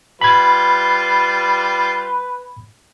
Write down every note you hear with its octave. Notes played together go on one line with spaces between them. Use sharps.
G3 F4 B4 B5 G#6